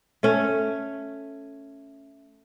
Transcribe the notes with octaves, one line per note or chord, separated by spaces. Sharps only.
A3 C#4